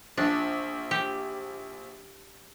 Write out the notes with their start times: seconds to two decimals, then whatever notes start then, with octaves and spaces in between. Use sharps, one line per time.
0.17 A#1 D4
0.91 G4